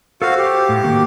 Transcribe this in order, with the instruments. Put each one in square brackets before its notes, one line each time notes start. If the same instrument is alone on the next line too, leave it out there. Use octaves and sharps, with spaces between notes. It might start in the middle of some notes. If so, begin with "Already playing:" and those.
[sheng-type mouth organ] F#4 F5 [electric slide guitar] A4 B4 C5
[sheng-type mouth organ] G4
[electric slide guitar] A2
D#3 A#3 F#4